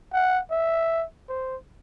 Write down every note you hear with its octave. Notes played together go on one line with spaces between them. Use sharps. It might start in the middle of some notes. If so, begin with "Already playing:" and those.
F#5
E5
C5